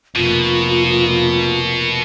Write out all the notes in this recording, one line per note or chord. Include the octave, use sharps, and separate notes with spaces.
F1 B2 A#3 F4